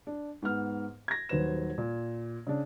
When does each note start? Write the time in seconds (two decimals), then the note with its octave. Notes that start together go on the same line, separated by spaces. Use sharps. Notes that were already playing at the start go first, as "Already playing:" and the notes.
0.07 D4
0.42 G#2 B3 F6
1.08 G#6 A#6
1.29 D#1 D#2 F#3 B4 C5 E7
1.78 A#2
2.47 C#3 D4